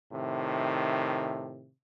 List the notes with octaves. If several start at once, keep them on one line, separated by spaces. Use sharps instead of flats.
A2 C3 D#3